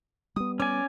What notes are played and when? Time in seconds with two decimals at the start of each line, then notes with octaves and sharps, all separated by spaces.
0.36 G3 B3 D#6
0.60 C#4 D5 G#5